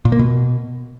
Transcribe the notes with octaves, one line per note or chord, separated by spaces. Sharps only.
A#2
A#3
B2